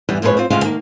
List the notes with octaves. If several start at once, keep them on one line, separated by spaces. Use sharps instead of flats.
E2 G2 E3 G3
F2 A#2 G#3 A#4 B4 C#5
C4 F4
D2 C#3 G#3 F4 F5
D#3 A#3